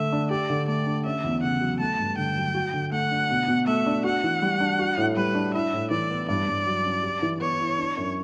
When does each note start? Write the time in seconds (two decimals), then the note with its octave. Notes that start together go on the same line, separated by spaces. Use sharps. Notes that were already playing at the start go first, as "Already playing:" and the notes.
Already playing: D3 A3 E5
0.12 D4
0.30 G4 D5
0.50 D3
0.68 A3 D5
0.86 D4
1.05 C#4 E5
1.24 E2
1.43 C#3 F#5
1.61 F#3
1.80 A3 A5
1.99 G2
2.18 D3 G5
2.36 F#3
2.54 F#4
2.74 D3
2.92 A3 F#5
3.11 D4
3.30 B2
3.48 B2
3.67 A3 E5
3.86 D4
4.04 F#4 F#5
4.23 E3
4.42 G3
4.60 D4
4.79 F#4
4.97 A2
5.17 G3 B4
5.35 D4
5.54 E4 E5
5.73 A2
5.91 E3 D5
6.11 B3
6.28 G2 D5
6.47 G2
6.66 F#3
6.85 C#4
7.03 G4
7.22 E3
7.41 B3 C#5
7.60 E4
7.78 D4
7.97 F#2